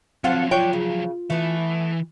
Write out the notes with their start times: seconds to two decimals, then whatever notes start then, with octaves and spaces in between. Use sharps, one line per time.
0.24 F3 F#3 C4 F4 A4 F#5
0.51 D4 F4 C#5 G5
0.73 C#3
1.30 E3 A3 B3